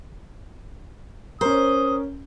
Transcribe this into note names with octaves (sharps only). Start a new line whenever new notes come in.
C#4 A#4 C5 D#6